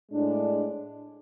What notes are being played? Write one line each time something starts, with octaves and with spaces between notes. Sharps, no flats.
A2 G#3 D4